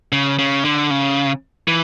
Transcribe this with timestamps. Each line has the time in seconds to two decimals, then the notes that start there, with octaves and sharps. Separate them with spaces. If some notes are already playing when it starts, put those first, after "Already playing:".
0.12 C#3
0.39 C#3
0.65 D3
0.90 C#3
1.68 E3